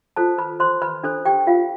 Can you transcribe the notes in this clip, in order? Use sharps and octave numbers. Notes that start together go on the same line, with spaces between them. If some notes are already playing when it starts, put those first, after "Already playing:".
F4 A4 C5 A5
B4 B5
C5 C6
B4 B5
D4 A4 C5
G4 G5
F4 F5